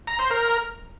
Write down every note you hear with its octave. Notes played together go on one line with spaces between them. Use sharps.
A#5
C5
A#4